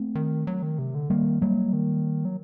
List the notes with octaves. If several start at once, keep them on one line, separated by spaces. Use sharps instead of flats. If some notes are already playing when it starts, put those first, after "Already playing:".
Already playing: A3 C4
D#3
F#3
D#3
C3
D3
D#3 G3 A#3
F#3 G3 A#3
D#3
F#3